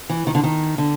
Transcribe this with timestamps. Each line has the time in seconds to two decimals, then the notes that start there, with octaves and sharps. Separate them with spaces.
0.09 E3
0.27 D#3
0.35 D3
0.43 D#3
0.78 D3